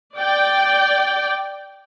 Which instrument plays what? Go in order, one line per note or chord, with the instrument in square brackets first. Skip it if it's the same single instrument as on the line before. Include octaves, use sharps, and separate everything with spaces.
[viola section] D5 G5